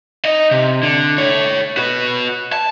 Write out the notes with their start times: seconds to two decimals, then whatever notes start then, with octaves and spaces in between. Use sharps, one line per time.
0.25 D#4 D#5
0.51 C3
0.83 D3
1.18 A4 C#5
1.77 F#4 B4
2.53 A5